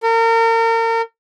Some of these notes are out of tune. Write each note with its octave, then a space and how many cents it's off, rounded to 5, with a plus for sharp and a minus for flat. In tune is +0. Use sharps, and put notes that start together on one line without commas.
A#4 -35